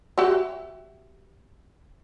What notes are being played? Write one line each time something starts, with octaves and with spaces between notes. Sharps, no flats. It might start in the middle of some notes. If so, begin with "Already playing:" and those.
F#4 G4 E5